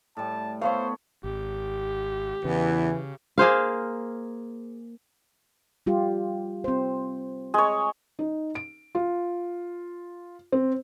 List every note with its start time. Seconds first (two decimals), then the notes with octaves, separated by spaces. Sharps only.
0.17 A2 G3 A5
0.62 A3 B3 C5 C#5 F5
1.24 G#1 G4
2.45 E2 C#3 E3
3.38 A#3 G#4 C5 F5
5.86 G3 F4 G4
6.64 C4 C5
7.54 G#3 C#5
8.19 D#4
8.55 D7
8.95 F4
10.52 C4